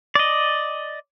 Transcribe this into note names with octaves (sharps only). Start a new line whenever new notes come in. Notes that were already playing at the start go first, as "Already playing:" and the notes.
D5 D#5